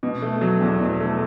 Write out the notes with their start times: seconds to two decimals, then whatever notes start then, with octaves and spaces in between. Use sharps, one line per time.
0.03 B2
0.22 A3
0.41 F#3
0.61 E2
0.80 B2
1.00 A3